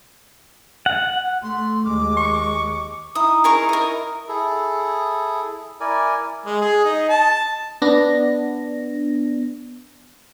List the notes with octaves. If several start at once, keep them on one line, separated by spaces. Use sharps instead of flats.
F#5
A3 C6
D#2 G#3 D6
C#6
D#4 E4 D#6
G#4 A#4 C#6
A#4 D#5
E4 G#4 A4
E4 A#4 D5 G#5
G#3
G#4
D#4
A5
B3 D4 A#6